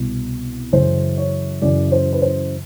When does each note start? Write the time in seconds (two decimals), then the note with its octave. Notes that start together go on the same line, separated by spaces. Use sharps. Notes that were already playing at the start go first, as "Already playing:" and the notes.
Already playing: C2 B2
0.72 F#2 C#3 E3 C5
1.17 C#5
1.62 F#2 C#3 E3 D5
1.92 C5
2.13 B4
2.22 C5